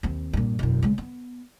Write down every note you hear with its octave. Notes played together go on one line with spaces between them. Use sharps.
D#2 C4
G2 A#2
E1 F#2
C#3 G#3
B3